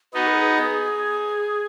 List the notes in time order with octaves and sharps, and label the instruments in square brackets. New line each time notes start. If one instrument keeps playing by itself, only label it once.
[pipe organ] B3 D#4 [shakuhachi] F#4
[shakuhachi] B4
G#4
G#4